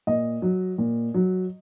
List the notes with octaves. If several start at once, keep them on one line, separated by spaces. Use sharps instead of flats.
A#2 D#5
F#3
A#2
F#3